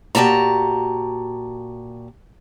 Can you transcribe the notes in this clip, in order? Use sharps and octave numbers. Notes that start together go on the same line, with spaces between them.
A#2 F#4 G4 A5 A#5